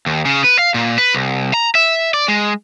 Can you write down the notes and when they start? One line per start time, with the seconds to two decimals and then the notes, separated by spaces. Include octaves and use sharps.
0.06 D#2
0.25 C#3
0.44 B4
0.59 F5
0.74 A#2
0.98 B4
1.14 C2
1.54 A#5
1.75 E5
2.14 D5
2.28 G#3